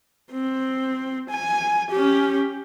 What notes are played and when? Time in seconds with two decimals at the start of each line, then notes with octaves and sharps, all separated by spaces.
0.32 C4
1.30 G#5
1.91 C#4 G4